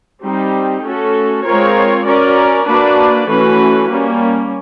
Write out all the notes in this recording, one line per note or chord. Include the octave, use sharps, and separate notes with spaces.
G3 C4 D#4 G4
A3 C#4 F#4 A4
G#3 C4 F4 A#4 C#5
C#4 F#4 A#4 D5
A#3 D4 F#4 B4 D5
E3 A3 C#4 F#4 B4
G3 A#3 C#4